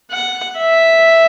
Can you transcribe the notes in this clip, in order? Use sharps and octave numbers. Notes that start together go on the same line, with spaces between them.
F#5
E5